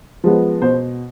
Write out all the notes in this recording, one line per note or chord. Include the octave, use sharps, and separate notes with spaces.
F3 G#3 B3
B2 C5